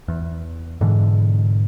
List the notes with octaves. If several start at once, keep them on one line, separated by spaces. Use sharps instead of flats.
E2
G#2 B2 D3 E3